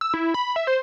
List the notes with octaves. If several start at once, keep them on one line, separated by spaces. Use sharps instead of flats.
E6
E4
B5
E5
C5